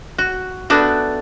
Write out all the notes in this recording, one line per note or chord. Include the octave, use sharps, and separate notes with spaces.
F#4
A3 B3 D4 F#4